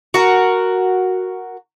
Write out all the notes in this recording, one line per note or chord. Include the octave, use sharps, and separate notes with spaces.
F#4 A#4